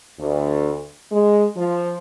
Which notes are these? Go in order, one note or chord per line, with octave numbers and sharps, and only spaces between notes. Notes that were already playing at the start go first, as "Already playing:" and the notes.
D2
G#3
F3